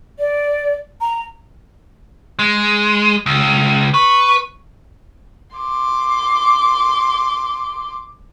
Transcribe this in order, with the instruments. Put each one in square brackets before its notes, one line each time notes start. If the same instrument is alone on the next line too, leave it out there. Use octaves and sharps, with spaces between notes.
[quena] D5
A#5
[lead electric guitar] G#3
C#2
[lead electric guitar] B4 [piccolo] C#6
[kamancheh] C6 D6